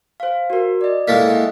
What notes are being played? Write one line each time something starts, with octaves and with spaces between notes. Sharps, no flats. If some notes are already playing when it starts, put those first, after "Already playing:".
C5 F5
F#4 A#4
D5 D#5
A2 G#3 A#3 A6 B6
D#5 E5 F#5